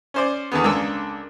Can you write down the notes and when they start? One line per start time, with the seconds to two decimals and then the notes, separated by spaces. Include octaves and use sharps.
0.14 C#4 C5 D5
0.51 E2 D3 D#3 B3
0.64 C#2 A#3 D4 A4 E6